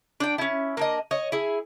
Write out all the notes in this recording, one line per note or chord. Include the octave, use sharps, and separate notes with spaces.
D4 G5
C#4 E4
A#3 D4 D#5
C#5 D#5
E4 G#4